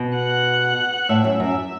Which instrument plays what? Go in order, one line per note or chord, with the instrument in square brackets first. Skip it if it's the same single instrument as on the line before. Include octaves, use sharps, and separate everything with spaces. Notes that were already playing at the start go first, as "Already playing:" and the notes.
Already playing: [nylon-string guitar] B2
[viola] F#5
[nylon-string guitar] A2 [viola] E5
[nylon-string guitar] F#2
[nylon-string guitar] F#2 [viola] E5